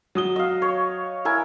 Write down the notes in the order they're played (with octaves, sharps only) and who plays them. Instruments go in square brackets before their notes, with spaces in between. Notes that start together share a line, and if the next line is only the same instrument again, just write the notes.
[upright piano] F#3 D#6 G7
[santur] D#5 F5
C#5
E4 A#4 G#5